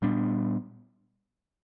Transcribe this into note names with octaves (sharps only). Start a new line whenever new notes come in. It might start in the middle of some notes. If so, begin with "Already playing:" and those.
A#2 G3 B3 D4